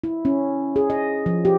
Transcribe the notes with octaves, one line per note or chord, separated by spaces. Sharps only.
E4
C#4
G#4
D#5
F3
G4